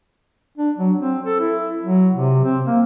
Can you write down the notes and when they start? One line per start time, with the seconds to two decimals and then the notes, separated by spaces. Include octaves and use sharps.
0.58 D4
0.78 F#3
1.00 C4
1.26 A4
1.40 E4
1.83 F#3
2.14 C3
2.44 C4
2.66 A#3